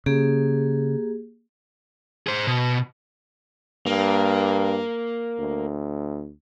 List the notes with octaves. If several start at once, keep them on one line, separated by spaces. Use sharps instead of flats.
C#3 A#3 G4 G#4
G#4 C5
B2
G2 A#3
D2